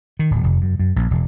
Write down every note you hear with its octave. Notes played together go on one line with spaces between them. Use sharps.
D#3
D1
F1
F#2
F#2
A#1
E1